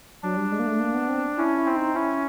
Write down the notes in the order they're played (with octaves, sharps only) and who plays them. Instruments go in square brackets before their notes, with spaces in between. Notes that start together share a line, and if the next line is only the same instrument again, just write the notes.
[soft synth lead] F#3 [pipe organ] D4
[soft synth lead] G3
G#3
A#3
A3
A#3
B3
C4
[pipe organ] C#4 [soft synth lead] E4
[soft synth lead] E4
[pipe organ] C4
[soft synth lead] D#4
[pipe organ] C#4 [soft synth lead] E4